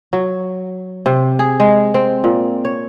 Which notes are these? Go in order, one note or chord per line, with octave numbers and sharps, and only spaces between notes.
F#3
C3
G#4
G#3
C4
A#2
C#5